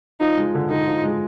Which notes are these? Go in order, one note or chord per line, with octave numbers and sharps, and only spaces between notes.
F3 D#4
G#3
D3
D3 D#4
F3
G#3